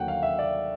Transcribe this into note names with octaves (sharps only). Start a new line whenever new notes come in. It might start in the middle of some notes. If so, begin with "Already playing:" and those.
Already playing: D#2 D3 F#3 F#5 G5
F5
E5
D5